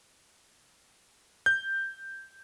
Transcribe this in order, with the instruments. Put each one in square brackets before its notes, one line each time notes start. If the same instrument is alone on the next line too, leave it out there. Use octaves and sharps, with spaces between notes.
[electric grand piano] G6